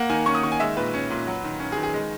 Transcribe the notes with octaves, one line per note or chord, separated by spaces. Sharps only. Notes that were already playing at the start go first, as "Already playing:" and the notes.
Already playing: A#3 F#5
D#3 G#5
C#4 C#6
D#6
D#3 C#6
G#5
G#3 E5
A#2 B4
C#4
A#2
F#3
D#3
C#4
G#4
D#3
G#4
G#3